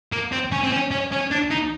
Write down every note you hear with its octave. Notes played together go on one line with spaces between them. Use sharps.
A#3
C4
C#4
C4
C#4
C#4
C#4
D4
D#4